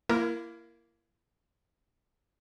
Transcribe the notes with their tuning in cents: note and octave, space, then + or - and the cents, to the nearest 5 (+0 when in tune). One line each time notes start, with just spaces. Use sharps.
A#3 +0 E4 +30 A#4 +0